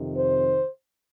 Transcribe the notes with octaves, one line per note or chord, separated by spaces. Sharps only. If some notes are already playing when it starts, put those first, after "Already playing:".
Already playing: F2 C3 D#3
C5